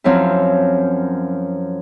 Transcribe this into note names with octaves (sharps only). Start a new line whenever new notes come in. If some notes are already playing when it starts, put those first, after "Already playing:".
F#2 F3 F#3 C4 E4